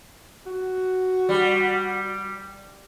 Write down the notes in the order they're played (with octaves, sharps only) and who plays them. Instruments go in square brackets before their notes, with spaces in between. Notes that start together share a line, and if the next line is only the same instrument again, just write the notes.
[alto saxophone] F#4
[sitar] G3